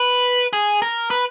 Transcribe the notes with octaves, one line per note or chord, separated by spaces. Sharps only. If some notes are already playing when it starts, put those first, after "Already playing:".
Already playing: B4
G#4
A#4
B4